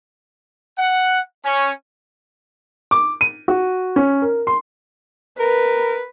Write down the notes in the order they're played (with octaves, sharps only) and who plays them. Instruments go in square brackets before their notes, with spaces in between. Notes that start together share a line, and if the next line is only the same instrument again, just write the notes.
[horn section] F#5
C#4
[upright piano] D6
D#7
F#4
C#4
A#4
C6
[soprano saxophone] A#4 [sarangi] B4